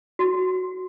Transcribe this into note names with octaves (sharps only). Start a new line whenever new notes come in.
F#4